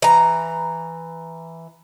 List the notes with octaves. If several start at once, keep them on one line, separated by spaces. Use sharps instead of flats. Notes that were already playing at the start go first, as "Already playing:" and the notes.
E3 A#5